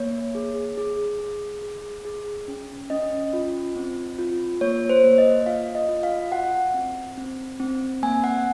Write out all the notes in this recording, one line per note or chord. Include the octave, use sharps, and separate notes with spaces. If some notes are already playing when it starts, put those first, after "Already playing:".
Already playing: A#3 C#5
G#4
G#4
G#4
G#4
G#4
C#4
C#4 D#5
F4
C4
F4
A#3 C#5
C5
A#3
D#5
F4 F5
D#5
F4
F5
F#4 F#5
C4
C4
C4
A#3 G#5
F#5